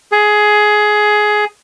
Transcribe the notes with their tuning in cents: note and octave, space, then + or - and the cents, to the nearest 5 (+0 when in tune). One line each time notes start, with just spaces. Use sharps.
G#4 +15